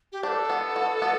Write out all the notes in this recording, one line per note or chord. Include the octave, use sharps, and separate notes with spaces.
G4
D4 C5
A4
B3
F#4
B3